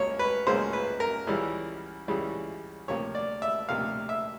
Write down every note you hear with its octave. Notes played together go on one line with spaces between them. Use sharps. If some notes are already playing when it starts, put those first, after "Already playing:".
Already playing: C#2 F#3 A#3 C#5
B4
C#2 C#3 F#3 A#3 C5
B4
A#4
C#2 C#3 E3 G3
C#2 C#3 E3 G3
D2 C3 F3 A#3 C#5
D5
E5
D2 C3 F3 A#3 F5
E5